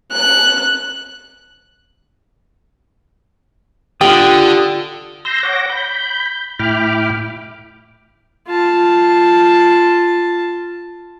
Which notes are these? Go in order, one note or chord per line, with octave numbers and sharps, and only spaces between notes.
F#6
D3 F4 G4 G5 D#6
C6 E6 G6 A#6
C#5 F#5 D6 A#6
B5 G6
A2 E4 G5 B5 D6 F6
F4 A5